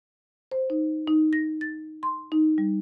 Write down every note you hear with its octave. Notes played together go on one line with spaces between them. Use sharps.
C5
D#4
D#4
A#6
A6
C6
D#4
G3